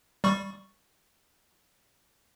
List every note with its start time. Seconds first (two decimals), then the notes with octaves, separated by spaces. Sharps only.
0.24 G3 C#6